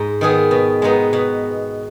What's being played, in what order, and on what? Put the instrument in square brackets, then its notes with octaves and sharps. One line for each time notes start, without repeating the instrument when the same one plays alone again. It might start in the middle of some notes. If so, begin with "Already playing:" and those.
Already playing: [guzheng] G#2
D#3 B3 G#4
B2
G#3 B3 D#4
B2